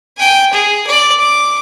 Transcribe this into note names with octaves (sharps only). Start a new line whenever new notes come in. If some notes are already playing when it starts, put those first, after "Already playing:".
G5 G#5
G#4
D5
D6